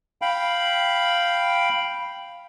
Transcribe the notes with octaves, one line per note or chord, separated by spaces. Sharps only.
F5 G5 B5